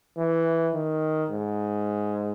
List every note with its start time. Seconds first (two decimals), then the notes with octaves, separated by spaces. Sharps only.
0.17 E3
0.74 D#3
1.30 G#2